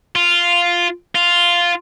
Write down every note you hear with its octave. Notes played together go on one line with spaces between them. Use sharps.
F4
F4